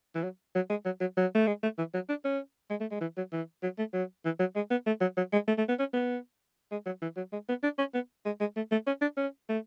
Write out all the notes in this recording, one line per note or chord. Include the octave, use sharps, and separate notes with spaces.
E3
F#3
F#3
G#3
F#3
F#3
F#3
A3
G#3
A3
E3
F#3
D4
C#4
G#3
A3
G#3
E3
F#3
E3
F#3
A3
F#3
E3
F#3
G#3
B3
A3
F#3
F#3
G#3
A3
A3
B3
C#4
B3
G#3
F#3
E3
F#3
G#3
B3
D4
C#4
B3
G#3
G#3
A3
A3
C#4
D4
C#4
A3